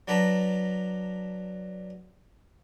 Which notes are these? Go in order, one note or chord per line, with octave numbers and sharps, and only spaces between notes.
F#3 D4 B4 A5 A#5